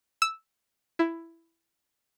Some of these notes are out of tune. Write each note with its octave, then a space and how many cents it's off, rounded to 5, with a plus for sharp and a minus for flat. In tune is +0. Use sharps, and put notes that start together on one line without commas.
E6 -5
E4 +10